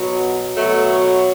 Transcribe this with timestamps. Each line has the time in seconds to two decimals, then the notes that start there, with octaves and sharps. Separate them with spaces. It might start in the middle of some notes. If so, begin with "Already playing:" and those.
Already playing: B2 F#3
0.56 B2 F#3 A3